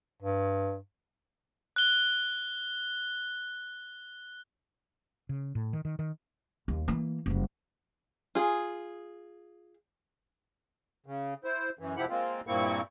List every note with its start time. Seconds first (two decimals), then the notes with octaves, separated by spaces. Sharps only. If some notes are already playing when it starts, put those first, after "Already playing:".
0.22 G2
1.76 F#6 G7
5.29 C#3
5.55 A2
5.73 D#3
5.85 D#3
5.99 D#3
6.68 D#2
6.88 E3 A#3
7.26 F#1 G3
8.35 F4 G#4
11.06 C#3
11.44 E4 C5
11.79 F#2 E3
11.97 C3 F3 E4 G4 F#5 B5
12.09 G#3 A#3 C4 F4
12.47 G2 A#2 A#3 C4 E4 C#6